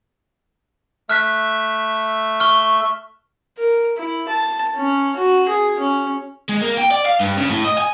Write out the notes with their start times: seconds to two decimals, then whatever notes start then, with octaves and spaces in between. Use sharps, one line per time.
1.09 A3 E5 F6 F#6 B6
2.40 C#6 F6
3.58 A#4
3.97 E4
4.28 A5
4.76 C#4
5.16 F#4
5.48 G#4
5.79 C#4
6.49 G#3
6.62 A#3
6.78 G5
6.91 D5
7.06 F5
7.20 G2
7.38 C#3
7.50 A2
7.65 D#5
7.78 G#5